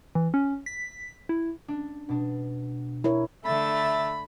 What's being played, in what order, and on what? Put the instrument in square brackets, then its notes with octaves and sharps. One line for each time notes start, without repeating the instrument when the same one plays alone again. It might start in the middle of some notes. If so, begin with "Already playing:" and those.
[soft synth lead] E3
C#4
B6
E4
[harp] D4
B2 D4
[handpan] E4 A#4 C#5
[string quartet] D3 A3 A6 [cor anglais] E5 [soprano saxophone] B5